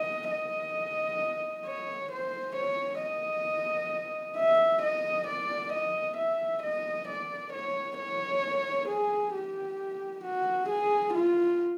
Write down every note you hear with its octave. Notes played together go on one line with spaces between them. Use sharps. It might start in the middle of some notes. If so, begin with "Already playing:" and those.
Already playing: D#5
D#5
C#5
C5
C#5
D#5
E5
D#5
D5
D#5
E5
D#5
D5
C#5
C#5
G#4
G4
F#4
G#4
F4